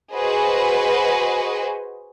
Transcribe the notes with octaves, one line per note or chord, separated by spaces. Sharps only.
F#4 G#4 B4 C5 D#5